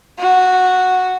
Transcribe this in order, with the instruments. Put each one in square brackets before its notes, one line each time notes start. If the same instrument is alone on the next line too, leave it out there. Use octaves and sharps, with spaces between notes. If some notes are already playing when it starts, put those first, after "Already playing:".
[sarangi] F#4